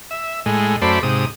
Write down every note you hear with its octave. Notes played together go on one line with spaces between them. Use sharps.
E5
A2 G#3
F#2 A3 C5 D5 B5
G#2 C3 D#6